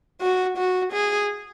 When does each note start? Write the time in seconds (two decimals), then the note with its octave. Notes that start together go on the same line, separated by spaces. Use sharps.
0.21 F#4
0.58 F#4
0.92 G#4